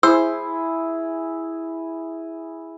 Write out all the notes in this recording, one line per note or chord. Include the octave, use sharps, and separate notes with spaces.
E4 G#4 C5 E6